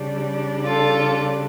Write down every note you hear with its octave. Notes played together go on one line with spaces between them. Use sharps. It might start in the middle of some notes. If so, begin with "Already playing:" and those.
Already playing: C#3 G3 D4
F4 A4